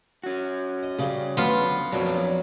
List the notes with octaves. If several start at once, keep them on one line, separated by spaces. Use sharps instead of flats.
C#4 F#4
D#5
C#3 G3 C5
D2 F#3 B3 F4
F2 A#2 F3 F#3 A#4 C#5 D5